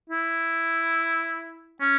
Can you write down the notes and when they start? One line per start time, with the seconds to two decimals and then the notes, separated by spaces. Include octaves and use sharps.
0.10 E4
1.81 C#4